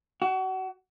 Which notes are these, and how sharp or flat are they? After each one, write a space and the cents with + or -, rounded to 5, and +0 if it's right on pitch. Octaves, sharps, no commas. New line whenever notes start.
F#4 +30